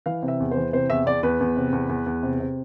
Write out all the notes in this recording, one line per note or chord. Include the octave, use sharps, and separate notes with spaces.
E3 F5
C3
E5
E2
C5
E3
C3 C5
E2 E5
E2 D5
E2 B4
E2
C3
E2
E2
E2
C3
C3